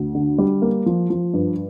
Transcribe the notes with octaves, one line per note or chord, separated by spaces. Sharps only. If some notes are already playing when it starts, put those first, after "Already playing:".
Already playing: D2
D3
G3
A#3
F3
F3
G2